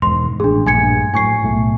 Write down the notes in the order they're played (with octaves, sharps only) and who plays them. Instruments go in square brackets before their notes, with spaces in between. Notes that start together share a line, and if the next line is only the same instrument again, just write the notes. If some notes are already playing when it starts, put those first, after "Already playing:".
[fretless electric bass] E1 G#2 D#3 [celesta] C6
[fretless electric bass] A1 [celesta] D4 G#4
[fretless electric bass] A#1 G2 A3 [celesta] G#5 G#6 C#7
[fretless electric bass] A2 F#3 [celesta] G#5 C#6 C7
[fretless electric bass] B1 A2 A3